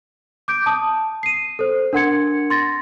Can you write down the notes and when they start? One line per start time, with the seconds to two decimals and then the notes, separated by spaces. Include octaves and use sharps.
0.48 D6 G6 D7
0.66 A5 D#6
1.23 C7 D#7
1.59 A4 C5
1.93 D4 A#4 F#5 C6 G#6 C#7
2.50 C6 A6 A#6